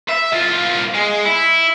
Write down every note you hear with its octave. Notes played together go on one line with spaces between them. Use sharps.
E5
C2 F4
G#3
E4